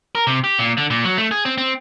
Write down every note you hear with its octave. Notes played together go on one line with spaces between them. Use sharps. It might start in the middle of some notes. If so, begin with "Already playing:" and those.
A#4
C3
G4
A#2
D3
A#2
F#3
A3
G#4
C4
C4